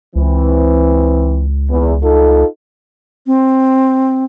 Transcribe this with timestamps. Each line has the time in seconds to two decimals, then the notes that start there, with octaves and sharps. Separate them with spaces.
0.16 C#2 E3 C4
1.70 E2
2.02 D#4 F4 A4
3.27 C4